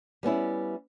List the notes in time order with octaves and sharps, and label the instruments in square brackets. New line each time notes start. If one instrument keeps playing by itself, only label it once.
[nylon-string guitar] G3 B3 C#4 E4